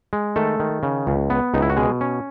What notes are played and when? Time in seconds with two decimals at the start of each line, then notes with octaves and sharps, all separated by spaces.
0.13 G#3
0.36 D#3 A3 A4
0.60 D#3
0.83 C#3
1.07 C#2
1.30 B3
1.54 C#2 D#4
1.62 E4
1.70 F#4
1.77 B2 G#3 G#4
2.01 C#4